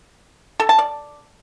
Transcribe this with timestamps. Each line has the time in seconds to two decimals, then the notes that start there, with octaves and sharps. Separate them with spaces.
0.60 A4
0.69 A5
0.79 D5